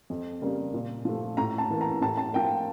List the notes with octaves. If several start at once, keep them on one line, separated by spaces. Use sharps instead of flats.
F2
C#3 G3 A#3
A#2
F3 A3
A2 A#5
A5
E3 A#3
A#5
A2 A5
A5
F3 A#3 G5